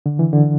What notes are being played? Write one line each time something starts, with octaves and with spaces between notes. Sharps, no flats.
D3
E3
D3